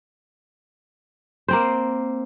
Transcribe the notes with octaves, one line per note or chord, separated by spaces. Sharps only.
A#3 C4 C5